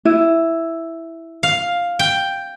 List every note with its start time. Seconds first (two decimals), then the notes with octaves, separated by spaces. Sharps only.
0.05 E4
1.43 F5
1.99 G5